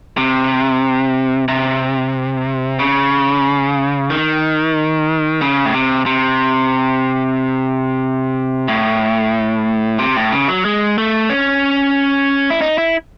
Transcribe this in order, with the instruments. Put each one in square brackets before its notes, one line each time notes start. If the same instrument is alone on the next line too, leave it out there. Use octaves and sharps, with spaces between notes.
[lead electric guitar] C3
C3
C#3
D#3
C#3
A2
C3
C3
A2
C3
A2
C#3
F#3
G#3
A3
C#4
E4
D#4
E4